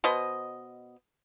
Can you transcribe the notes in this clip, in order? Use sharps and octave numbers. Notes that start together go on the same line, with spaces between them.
B2 C5 D#5